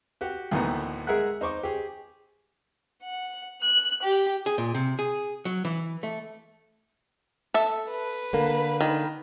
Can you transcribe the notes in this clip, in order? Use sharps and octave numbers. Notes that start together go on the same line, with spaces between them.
F#4 G4 F#5
D2 A2 D#3 E3 A#3 B3
G#3 G#4 A#4 E5 F#5 F#6
D#4 C5 C#6 D6
G4 G#4
F#5
F#6
G4
G#4
A#2
C3
G#4
F#3
E3
A3
A4 E5
B4
D3 A#3
D#3